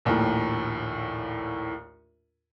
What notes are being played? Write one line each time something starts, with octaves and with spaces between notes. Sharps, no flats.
A#1 D#2 A2